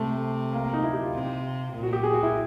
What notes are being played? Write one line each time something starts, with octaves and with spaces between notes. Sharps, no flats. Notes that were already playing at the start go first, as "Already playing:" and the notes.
Already playing: C3 A3
A#3
A#3
D#4
E4
G4
F4
C3
A#2
F#4
G4
G#4
F#4
E4